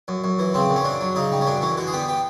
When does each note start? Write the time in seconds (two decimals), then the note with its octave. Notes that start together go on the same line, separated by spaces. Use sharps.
0.08 F#2
0.24 F#2
0.39 E3
0.54 C#3 C4
0.70 F#2
0.76 C#4
0.85 F#2 D4
1.01 F#3
1.15 C#3 D#4
1.32 G3
1.41 C#4
1.47 F#2 D4
1.62 E3 C#4
1.77 D3 F#4
1.87 G#4
1.93 B3 G4
2.09 G4